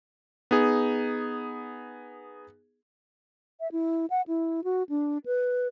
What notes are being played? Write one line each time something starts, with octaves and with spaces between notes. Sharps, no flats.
B3 D#4 G#4
E5
E4
F#5
E4
F#4
D4
B4